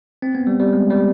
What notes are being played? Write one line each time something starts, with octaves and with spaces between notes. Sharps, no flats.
C4
B3
G3
G3
G#3
G3